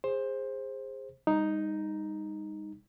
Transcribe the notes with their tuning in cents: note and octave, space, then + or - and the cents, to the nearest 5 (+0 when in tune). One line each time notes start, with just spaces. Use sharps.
G#4 -25 C5 +15
G3 +45 D#4 +0